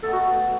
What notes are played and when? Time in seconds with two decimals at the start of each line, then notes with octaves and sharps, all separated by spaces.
0.03 B2 A3 D#4 A4
0.13 F#4